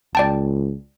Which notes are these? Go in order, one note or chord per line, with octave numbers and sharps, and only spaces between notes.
C#2 D5 G5 A5